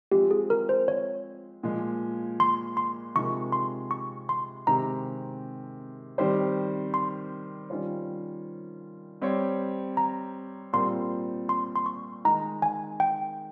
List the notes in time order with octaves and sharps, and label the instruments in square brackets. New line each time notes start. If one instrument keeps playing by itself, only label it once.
[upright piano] F3 G#3 C4 [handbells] G4
[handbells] G#4
A#4
C5
C#5
[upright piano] A#2 F3 G#3
[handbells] C6
C6
[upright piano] C3 F3 G#3 D#4 A#4 [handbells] C#6
[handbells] C6
C#6
C6
[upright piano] C3 D#3 G#3 C4 G4 [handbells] A#5
[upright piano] D#3 G3 C4 G4 C5
[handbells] C6
[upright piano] D#3 G3 C#4 F4 C5
G3 C4 G4 C#5
[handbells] A#5
[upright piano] A#2 G3 C4 F4 A#4 [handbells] C6
[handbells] C6
C6
C#6
[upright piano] D#3 G#3 D#4 [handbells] A#5
[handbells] G#5
G5